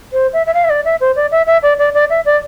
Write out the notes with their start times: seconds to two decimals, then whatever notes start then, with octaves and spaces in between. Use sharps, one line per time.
0.13 C5
0.33 E5
0.47 E5
0.54 F5
0.64 E5
0.70 D5
0.85 E5
1.01 C5
1.16 D5
1.32 E5
1.47 E5
1.63 D5
1.79 D5
1.94 D5
2.10 E5
2.25 D5